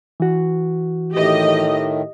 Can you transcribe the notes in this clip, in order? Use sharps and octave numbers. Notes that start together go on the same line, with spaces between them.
E3 F#4
A2 D#3 A3 G4 D#5